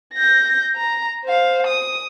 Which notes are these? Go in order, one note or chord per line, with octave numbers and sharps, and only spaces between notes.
G6 A#6
A#5
C5 F5
D#6